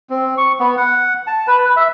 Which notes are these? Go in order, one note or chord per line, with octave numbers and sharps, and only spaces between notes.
C4
C#6
B3
F#5
A5
B4
E5